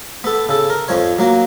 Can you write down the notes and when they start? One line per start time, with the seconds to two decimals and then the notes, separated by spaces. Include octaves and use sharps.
0.24 B3 A4
0.49 C#3 A4
0.70 A#4
0.88 F2 F3 C#5
1.19 F#3 A#3